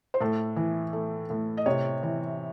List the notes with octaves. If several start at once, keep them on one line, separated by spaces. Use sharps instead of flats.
C5
A2 A4
E3
A3
A2
D#5
C3 C#5
E3